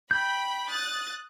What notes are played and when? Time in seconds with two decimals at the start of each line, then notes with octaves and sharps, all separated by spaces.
0.11 G5 B5 G6
0.70 D#6 F#6 A6